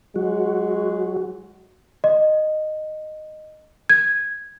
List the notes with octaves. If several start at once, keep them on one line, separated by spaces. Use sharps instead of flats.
F#3 G#3 F#4
D#5
G#6